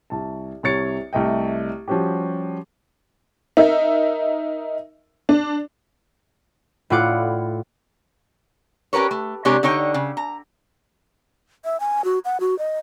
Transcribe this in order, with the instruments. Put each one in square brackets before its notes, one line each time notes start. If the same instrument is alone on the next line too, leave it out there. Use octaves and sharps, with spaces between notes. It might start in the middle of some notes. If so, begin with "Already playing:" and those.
[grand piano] C2 A5
C2 C3 C#5 A6 C#7
C2 A3 D#5 G5
F3 G3 C#4 F#4 G4
[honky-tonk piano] D#4 A#4 E5
D4
[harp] A2 E4 F4 D5 F#5 D6
[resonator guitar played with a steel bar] C#4 G4 A#4 B4 C#5
A3
C3 G#3 D4 G4 A#4 C#5
D3 D#4 C#5 G5
C#3
A#5
[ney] E5
G#5
F#4
F#5
F#4
D#5